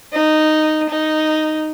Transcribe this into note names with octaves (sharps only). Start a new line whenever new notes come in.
D#4
D#4